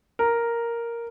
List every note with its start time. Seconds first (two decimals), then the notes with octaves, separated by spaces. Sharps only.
0.19 A#4